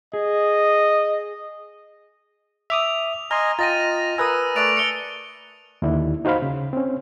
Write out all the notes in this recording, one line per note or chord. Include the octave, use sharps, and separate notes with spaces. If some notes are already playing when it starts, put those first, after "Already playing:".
G#4 D#5
E5 D6 D#6 F7
D#5 G#5 A#5 C6 F6
F4 D#5 G5 A#5 A6 A#6 D#7
A#4 B4 G#5 D#6 E6
A3 D5 D#6 F#6 D7 F7
C#7 G7
D#2 D3 D4 E4
D#4 F#4 C5 F5 B5
C#3
C4 C#4